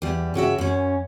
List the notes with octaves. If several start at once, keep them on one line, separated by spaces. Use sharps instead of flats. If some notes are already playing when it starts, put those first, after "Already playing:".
E2 G3
G2 C#3 F#4 E5
F#2 C#4